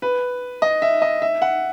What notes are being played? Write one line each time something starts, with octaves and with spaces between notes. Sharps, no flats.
B4
D#5
E5
D#5
E5
F#5